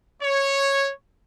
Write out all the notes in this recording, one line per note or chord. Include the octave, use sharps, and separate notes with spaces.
C#5